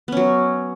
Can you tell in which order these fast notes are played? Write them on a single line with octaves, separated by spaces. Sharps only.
B3 C#4 F#3